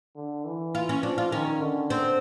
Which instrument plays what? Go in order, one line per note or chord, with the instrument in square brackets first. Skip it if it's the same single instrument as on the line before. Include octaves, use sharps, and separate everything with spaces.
[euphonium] D3
E3
[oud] F4
C#4
[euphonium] F3 [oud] D4
[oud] F4
[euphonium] D#3 [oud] C#4
[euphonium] D3
[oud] C4